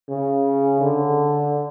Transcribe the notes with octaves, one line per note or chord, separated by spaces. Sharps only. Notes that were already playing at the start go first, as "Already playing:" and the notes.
C#3
D3